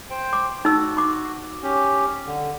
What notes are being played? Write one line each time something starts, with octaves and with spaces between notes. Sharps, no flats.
C5 G5
D6
D#4 F#4 E6
C6 D6
C#4 G4
D3